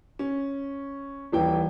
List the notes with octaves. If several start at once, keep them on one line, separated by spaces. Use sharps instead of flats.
C#4
D#1 E3 G5